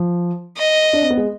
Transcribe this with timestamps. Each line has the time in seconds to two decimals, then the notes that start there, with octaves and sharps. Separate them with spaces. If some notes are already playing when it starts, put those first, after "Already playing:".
Already playing: F3
0.58 D#5
0.93 D4
1.02 C4
1.10 B3
1.17 G#3